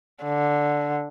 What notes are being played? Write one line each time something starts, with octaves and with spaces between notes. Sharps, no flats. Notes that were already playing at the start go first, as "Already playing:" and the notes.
D3